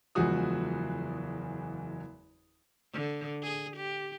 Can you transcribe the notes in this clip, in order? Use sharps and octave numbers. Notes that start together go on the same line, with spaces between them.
F#1 E2 F3 G#3 F#4 D#6
D3
G#4
G4